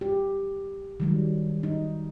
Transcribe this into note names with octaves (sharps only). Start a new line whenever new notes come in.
G4
D#3 F#3 G3
D#4